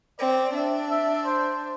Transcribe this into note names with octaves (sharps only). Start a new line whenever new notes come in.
C4 D5
D4 E5
E5
C5